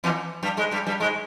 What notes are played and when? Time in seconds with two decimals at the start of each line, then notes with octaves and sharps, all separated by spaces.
0.04 E2 E3
0.43 G2 G3
0.57 G#2 G#3
0.71 G2 G3
0.87 G2 G3
1.00 G#2 G#3